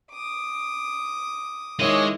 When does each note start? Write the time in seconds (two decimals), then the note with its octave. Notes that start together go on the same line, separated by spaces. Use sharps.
0.11 D6 D#6
1.79 D#3 G#3 E4 C#5 D#5 D6 D#6